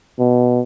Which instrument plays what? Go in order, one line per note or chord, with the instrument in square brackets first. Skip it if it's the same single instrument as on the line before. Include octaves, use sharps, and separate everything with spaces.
[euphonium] B2